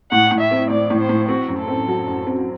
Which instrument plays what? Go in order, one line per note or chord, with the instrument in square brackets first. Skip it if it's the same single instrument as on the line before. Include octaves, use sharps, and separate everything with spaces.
[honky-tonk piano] A2 [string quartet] F#5
[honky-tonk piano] A2
[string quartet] E5
[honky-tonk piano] C4
[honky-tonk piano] A2 [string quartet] D5
[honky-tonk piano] A2
[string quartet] C5
[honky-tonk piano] A2
[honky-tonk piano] C4 [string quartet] F#4
[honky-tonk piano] F#2
[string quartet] A4
[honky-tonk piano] C4
F#3
F#2
C4